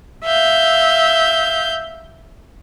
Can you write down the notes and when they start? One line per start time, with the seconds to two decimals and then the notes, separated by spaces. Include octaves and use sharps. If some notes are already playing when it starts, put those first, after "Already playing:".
0.24 E5 F5 G6